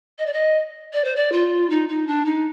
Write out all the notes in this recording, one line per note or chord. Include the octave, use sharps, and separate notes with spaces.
D#5
D5
D#5
D5
C5
D5
F4
D#4
D#4
D4
D#4